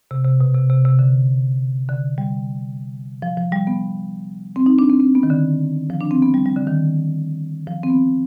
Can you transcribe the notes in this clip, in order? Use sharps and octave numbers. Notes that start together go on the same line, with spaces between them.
C3
C3
B2
C3
C3
C3
D3
D3
G3
F3
F3
G3
B3
C4
D#4
D4
C4
C4
B3
D#3
D3
F3
D4
C4
B3
G3
G3
D3
D#3
F3
C4
B3